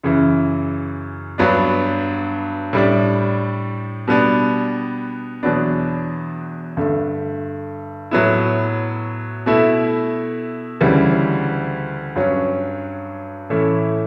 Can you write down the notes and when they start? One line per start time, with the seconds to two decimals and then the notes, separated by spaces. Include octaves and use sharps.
0.03 F#2 C#3 E3
1.38 G2 F#3 B3 D4
2.73 A2 G3 D4
4.08 B2 G3 B3 D4
5.43 E2 B2 F#3 B3 D4
6.77 G2 D3 A3
8.11 A2 F#3 B3 E4
9.46 B2 A3 E4
10.81 D2 C#3 E3 G3
12.16 G2 F#3 C#4
13.50 A2 E3 A3 C#4 E4